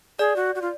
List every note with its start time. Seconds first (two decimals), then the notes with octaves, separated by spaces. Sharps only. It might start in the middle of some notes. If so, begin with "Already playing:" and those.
0.19 G#4 D5
0.36 F#4
0.55 F#4
0.62 F4